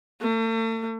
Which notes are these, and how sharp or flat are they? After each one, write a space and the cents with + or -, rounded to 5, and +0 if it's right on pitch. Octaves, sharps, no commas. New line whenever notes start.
A3 +45